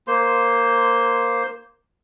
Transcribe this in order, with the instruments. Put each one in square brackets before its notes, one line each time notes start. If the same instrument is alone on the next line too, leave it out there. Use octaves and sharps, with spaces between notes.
[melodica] A#3 C5 C6